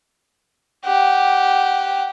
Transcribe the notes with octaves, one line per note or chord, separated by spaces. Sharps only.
G4 F#5